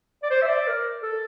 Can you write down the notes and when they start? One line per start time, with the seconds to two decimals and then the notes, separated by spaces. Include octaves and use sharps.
0.23 D5
0.30 C5
0.41 E5
0.47 D5
0.67 A#4
1.03 A4